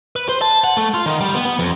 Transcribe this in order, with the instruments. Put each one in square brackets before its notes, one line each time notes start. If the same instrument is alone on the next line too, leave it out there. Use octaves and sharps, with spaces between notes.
[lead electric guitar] B4
C5
A5
F#5
A3
F4
D#3
G3
B3
B3
F2